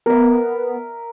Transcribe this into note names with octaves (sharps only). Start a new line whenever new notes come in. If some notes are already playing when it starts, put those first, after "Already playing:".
B3 A#4 E5